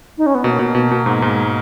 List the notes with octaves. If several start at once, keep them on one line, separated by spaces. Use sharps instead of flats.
D#4
C#4
B3
B2 A#3
B2
B2
B2
G#2
G#2